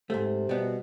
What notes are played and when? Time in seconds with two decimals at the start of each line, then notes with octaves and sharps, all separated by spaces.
0.10 G#2 C3 A3
0.49 B2 G3 B3